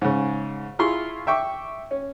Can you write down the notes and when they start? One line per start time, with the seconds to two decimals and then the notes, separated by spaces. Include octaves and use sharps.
0.02 G#2 C#3
0.79 E4 F4 G#4 C6 C#6
1.27 E5 G5 C#6 D6
1.91 C#4